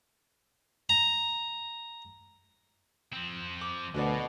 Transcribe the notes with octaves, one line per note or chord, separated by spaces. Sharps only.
A#5
F3 C4
D6
D2 B2 F#4 C#5 D5